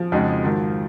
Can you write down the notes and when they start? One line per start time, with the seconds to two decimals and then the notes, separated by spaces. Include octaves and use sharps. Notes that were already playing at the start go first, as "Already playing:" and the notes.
Already playing: F3
0.12 F2 C#3 G#3 D#4 F#4
0.43 G#2 D#3 F#3